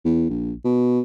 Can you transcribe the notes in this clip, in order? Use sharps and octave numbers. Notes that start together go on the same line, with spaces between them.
E2
A#1
B2